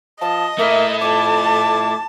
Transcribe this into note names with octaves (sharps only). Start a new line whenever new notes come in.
F3 D#5 A5
A3 A#3 E4 E5
F2 A5 D6